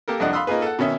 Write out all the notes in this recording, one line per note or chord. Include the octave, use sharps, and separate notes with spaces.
A#3 G4 A4 A#4
C2 F2 D4 D#5 F#5
F5 B5 C6 D#6 E6 F#6
A#3 D#4 F4 G#4 B4
A4 F#5
B2 D#3 C#4 E5